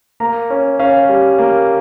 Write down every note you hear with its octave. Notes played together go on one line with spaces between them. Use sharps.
A#3 A#5
C#4
C#4 F5
G3
A#3